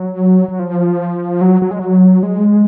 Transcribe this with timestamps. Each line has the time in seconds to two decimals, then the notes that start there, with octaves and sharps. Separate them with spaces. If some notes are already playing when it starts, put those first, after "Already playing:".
Already playing: F#3
0.49 F#3
0.59 F3
1.41 F#3
1.62 F#3
1.71 G#3
1.79 F#3
2.23 G#3